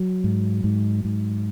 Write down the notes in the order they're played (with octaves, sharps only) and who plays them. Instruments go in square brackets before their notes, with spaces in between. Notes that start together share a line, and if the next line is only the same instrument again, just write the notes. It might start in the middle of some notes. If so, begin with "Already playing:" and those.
Already playing: [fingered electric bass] F#3
G#2
G#2
G#2